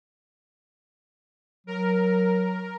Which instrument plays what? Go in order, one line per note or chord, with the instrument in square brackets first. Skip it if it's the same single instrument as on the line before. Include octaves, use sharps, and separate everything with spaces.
[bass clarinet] F#3 [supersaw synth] A#4